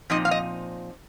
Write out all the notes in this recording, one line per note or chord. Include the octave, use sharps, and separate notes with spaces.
A#2 F3 C4 D#4 D#5
F5
D#5